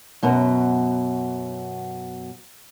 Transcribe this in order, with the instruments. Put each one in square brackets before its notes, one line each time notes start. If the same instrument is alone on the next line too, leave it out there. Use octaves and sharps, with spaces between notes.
[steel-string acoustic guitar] F#2 B2 F#3